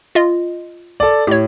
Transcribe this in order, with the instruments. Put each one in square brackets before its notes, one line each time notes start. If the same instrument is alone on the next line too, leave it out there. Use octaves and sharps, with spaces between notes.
[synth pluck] F4 D#5
[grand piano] A4 D5
[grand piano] A2 [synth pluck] G4 C#5